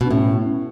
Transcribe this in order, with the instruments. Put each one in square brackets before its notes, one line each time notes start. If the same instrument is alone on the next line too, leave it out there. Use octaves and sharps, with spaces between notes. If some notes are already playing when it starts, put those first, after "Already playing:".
[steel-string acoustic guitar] B2 [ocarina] D4
[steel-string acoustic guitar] A2 [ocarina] C#4